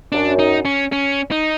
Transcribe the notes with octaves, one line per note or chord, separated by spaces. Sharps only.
F#2 D4
D#4
C#4
C#4
D#4